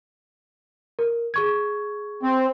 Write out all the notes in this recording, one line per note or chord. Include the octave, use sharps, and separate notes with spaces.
A#4
G#4 C#6 G#6
C4